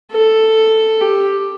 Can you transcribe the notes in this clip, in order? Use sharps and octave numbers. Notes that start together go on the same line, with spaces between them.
A4
G4